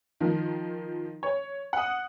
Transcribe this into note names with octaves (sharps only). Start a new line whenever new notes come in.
D#3 F3
C#5
F#5 D#6